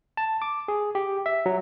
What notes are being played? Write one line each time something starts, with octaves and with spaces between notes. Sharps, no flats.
A5
D6
G#4
G4
E5
F#3